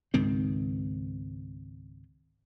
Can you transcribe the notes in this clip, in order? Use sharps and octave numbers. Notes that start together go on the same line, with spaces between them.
C#2 G#2 D#3 C4